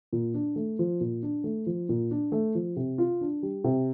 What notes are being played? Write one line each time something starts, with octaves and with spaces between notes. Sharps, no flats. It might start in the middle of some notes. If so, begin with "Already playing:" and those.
A#2
D4
A3
F3
A#2
D4
A3
F3
A#2
D4
A3
F3
C3
F4
D4
G3
C3